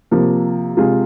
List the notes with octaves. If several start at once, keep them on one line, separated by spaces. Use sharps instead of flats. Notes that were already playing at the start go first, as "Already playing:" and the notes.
C3 F3 A#3
C3 G#3 F4 G#4